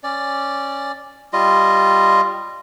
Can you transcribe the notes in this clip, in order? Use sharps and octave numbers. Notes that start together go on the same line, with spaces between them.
C#4 D5
G3 F4 D#5